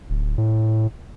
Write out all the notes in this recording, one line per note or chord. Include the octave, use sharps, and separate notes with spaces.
D1
A2